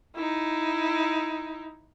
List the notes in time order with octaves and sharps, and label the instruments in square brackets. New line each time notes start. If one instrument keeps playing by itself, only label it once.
[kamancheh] D#4 E4